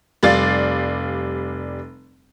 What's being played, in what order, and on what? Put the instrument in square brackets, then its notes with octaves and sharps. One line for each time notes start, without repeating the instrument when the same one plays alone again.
[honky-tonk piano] F1 G3 D5 F5 A6